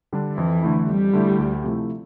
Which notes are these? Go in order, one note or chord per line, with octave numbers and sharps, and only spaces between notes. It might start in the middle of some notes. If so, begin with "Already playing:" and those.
D3 G3 D4
F2 E3
D3 A3 E4
F2 G3
D3 A3 E4
D2
C3 F3 A3 E4